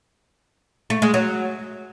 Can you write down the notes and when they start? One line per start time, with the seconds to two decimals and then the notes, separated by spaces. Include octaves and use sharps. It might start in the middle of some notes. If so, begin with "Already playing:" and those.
0.90 A3
1.02 G#3
1.14 F#3